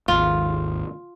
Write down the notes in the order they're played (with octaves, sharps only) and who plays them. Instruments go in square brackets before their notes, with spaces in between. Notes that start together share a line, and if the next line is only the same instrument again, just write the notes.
[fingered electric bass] G#1 D#2 [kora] F4